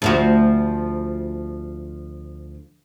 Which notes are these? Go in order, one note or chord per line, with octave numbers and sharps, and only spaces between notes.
D2 F3 F#4